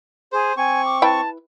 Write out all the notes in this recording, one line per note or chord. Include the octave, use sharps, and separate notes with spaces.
G#4 C5
C4 G#5 C#6
D6
E4 B4 G5 A5